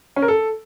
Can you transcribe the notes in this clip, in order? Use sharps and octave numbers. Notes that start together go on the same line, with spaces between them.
C#4
A#4
A4